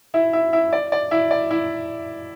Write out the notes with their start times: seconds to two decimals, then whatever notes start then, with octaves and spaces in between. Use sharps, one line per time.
0.14 E4 E5
0.33 E4 E5
0.53 E4 E5
0.73 D5
0.92 D5
1.11 E4 E5
1.31 D5
1.50 E4 E5